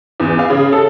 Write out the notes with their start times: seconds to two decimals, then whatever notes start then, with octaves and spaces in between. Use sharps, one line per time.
0.20 E2
0.39 F5
0.50 C#3
0.72 A4